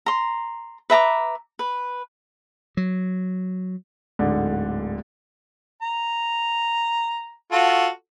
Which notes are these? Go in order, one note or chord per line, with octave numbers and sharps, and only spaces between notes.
A#5 C6
B4 E5 A#5 D6
B4
F#3
D1 G#2 D3
A#5
F4 F#4 A4